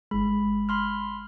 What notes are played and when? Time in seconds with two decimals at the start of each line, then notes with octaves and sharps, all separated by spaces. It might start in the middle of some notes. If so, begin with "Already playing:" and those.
0.11 G1 G#3 B5
0.69 B5 C6 F6